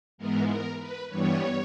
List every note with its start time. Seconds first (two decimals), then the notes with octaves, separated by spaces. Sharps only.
0.18 G#2 E3 G#3 B3 A#4
0.48 A#4
0.79 B4
1.09 G2 E3 G3 B3 C#5